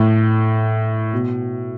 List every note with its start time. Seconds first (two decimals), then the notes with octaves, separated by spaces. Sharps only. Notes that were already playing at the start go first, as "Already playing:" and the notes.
Already playing: A2
1.13 B2